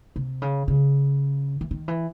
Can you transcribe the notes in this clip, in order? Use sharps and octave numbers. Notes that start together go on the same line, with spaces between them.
C3
C#3
C#3
E3
D#3
E3